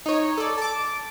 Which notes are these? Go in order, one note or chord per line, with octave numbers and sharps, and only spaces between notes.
D#4 C#5
A4 D5
A5 D6